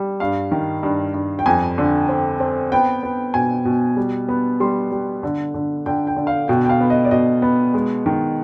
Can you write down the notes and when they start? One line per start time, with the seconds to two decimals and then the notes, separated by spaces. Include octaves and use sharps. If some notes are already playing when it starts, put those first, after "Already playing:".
Already playing: G3
0.20 G2 F5
0.52 D#3
0.83 G2
1.14 G2
1.39 G5
1.46 F2 G#5
1.78 D3
2.09 C4
2.40 C4
2.72 B3 G5
3.03 B3
3.34 B2 G#5
3.65 B2
3.97 G3
4.28 B3
4.60 G3 C6
4.91 G3
5.23 D3
5.54 D3
5.86 D3 G5
6.07 G5
6.16 D3
6.27 F5
6.48 B2 G5
6.65 G5
6.69 F5
6.80 B3
6.90 D#5
7.05 D5
7.11 B2 D#5
7.42 B3
7.74 G#3
8.06 D#3